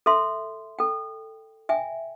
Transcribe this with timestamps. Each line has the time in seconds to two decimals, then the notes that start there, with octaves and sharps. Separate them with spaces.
0.06 A4 E5 C6
0.79 A4 G5
1.69 E5 G5 G#5